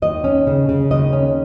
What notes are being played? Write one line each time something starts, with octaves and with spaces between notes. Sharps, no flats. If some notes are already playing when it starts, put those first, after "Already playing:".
D#2 D#5
C#4
C#3
C#3
D#2 D#5
C#4